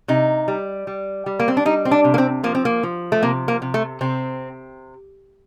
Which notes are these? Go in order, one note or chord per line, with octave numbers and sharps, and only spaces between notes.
C3 D#4
G3
G3
G3
A#3
C4
D4
G3 D#4
C4
D4
C3
A#3
C4
F3 A#3
C4
A#3
F3
A3
C3 A#3
A#3
C3
A3
C3 C4